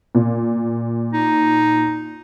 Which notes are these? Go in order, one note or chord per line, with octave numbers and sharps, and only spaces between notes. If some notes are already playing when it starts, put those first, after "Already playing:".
A#2
D#4